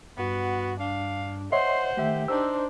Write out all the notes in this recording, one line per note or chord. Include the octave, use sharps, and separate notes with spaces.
G2 B3 F#4
D4 F5
C5 C#5 D#5 E5 F#5 C6
D#3 A3 G4 E5
D4 D#4 C5 E6